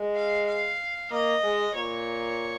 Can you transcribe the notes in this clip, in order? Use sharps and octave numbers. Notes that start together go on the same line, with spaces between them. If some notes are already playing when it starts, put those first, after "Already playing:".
Already playing: G#3
F5
F5
A#3 D#5
G#3
A#2 C#5